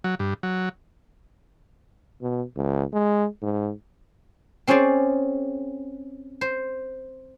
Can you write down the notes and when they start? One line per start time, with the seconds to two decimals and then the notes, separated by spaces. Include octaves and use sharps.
0.04 F#3
0.19 G2
0.43 F#3
2.21 B2
2.56 C#2
2.93 G#3
3.42 G#2
4.67 C4 C#4 G#4 C5 D5
6.41 C5